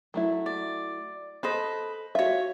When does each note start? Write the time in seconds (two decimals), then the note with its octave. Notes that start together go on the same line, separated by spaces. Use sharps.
0.14 F#3 A3 E4
0.46 D5
1.43 A4 B4 C5 D#5
2.15 F4 F#4 C#5 E5